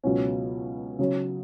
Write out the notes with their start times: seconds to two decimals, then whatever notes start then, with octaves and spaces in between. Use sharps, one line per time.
0.04 C#2 B2 F#3 C#4
0.99 C#3 F#3 C#4